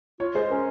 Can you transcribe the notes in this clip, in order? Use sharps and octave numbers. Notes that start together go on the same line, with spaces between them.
F4 C#5
G#3 C5
C#4 A#4